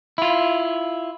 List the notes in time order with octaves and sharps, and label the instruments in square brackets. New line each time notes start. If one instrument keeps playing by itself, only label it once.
[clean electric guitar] E4 F4